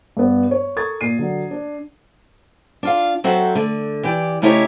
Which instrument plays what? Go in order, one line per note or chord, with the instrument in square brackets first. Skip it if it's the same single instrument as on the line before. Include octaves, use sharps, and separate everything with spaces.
[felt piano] G2 B3
C#5
A4 A#4 C#6 D#6 G#6 A6
A#2 C7 D#7
D3 F#3
D4
[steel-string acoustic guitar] D4 F4 F5
F#3 C4 F#4 A4 C5 E5
D3 A3
E3 G4 D5
C#3 A3 D#4 E4 G4 C#5